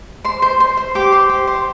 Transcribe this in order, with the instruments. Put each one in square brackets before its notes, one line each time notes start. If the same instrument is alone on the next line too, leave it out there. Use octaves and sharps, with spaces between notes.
[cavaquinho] C5 C6
C5
C5
C5
G4 D6
C5
G4
C5